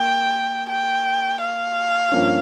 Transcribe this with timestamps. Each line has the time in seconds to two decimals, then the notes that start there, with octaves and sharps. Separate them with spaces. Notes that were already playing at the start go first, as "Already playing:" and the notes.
Already playing: A#3 G5
0.70 G5
1.41 F5
2.12 G2 F3 A#3 C#4